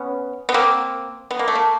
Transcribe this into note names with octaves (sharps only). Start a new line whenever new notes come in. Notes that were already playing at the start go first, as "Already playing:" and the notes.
Already playing: B3 C#4
B3
A#3 C4
B3
A#3
A3
A#3